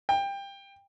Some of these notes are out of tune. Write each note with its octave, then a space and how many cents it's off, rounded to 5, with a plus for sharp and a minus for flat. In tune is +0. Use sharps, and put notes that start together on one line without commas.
G5 +20